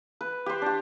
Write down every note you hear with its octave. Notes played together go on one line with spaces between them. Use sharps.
B4
G4 C5
D4 G4